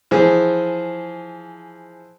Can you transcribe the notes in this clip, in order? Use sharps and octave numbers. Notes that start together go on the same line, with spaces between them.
E3 F3 G#4